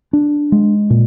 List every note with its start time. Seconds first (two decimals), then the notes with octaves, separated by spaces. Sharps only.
0.13 D4
0.52 G#3
0.90 A#2